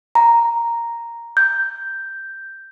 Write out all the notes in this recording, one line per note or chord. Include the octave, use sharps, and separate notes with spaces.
A#5
G6